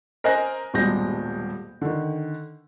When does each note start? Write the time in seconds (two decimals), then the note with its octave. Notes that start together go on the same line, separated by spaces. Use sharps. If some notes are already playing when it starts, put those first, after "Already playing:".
0.24 A#4 C5 D#5 G#5 F#6 A#6
0.74 D#1 G2 B2 G#3 G6 A#6
1.81 D3 D#3